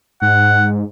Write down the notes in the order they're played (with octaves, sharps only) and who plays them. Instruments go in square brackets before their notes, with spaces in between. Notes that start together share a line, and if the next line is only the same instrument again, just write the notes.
[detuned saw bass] G#2 [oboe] F#5